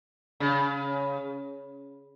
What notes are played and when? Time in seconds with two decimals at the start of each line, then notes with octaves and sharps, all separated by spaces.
0.40 C#3